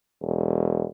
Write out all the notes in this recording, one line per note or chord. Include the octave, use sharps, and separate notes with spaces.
E1